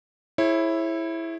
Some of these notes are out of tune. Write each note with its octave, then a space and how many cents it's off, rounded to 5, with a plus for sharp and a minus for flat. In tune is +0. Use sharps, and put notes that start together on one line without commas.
E4 +0 G#4 +20 C#5 -35